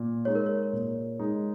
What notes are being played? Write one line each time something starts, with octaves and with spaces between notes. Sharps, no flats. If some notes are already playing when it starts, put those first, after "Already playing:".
Already playing: A#2
G#3 D#4 C#5
A#4
C#5
A#2
G#3 D#4